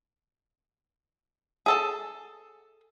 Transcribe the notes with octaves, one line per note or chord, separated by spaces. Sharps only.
G#4 A4 A5